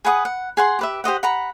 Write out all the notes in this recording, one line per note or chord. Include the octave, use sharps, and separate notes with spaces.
G#4 B4 F#5 D#6
F#5
G#4 F#5 C6
G4 B4 E5
G4 C5 D#5 F#5
F#5 A#5 B5